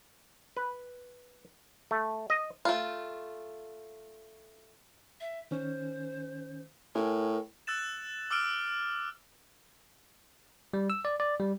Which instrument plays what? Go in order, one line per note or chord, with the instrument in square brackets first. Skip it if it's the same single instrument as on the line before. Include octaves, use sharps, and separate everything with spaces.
[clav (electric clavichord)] B4
A3
D#5
[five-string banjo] A3 F4
[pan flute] E5
[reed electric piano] D#3 C#4 [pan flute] C5
[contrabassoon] A2 [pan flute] A#4 [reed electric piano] G#5
[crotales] E6 F#6 A6 E7
D6 E6 F6 D7
[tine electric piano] G3
E6
D5
D5
G3